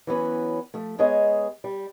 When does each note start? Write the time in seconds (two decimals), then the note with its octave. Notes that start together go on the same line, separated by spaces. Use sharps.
0.07 E3 F#3 B3 C#4
0.74 F3 A3
0.98 G#3 B3 G#4 C#5 D#5
1.64 G3